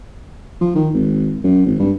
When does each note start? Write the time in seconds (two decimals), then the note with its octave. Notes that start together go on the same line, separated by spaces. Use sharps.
0.61 F3
0.75 D#3
0.94 G#1
1.44 F#2
1.66 G#1
1.79 G2